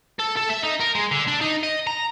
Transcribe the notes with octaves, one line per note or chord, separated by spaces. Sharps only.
A4
A4
E5
D#4
A#4
G#3
D3
D4
D#4
D#5
A#5